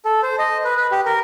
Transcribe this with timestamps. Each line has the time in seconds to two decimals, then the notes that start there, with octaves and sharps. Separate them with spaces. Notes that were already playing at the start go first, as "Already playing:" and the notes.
0.05 A4
0.23 C5
0.39 D#5
0.65 B4
0.77 B4
0.92 G4
1.06 A#4